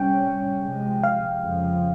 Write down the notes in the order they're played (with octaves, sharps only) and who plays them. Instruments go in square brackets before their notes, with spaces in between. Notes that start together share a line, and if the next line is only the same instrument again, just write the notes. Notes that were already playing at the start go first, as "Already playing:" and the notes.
Already playing: [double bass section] C3 G3 C#4 [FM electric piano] G5
[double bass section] C3 F3 G#3
[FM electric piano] F5
[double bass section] F2 C#3 F3